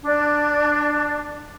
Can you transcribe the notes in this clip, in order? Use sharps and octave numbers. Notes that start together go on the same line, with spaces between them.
D4